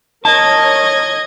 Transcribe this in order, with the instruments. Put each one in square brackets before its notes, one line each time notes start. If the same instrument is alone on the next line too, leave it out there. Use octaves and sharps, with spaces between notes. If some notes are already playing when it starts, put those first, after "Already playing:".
[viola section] A#4 C#5 [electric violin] D#5 G#6 [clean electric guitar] A5